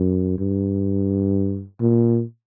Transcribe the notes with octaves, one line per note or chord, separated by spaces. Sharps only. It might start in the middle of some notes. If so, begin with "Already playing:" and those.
Already playing: F#2
G2
A#2